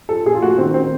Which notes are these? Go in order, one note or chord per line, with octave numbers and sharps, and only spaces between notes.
F3 A4
A#2 G#4
F4
A3 F#4
D#3 C4
C4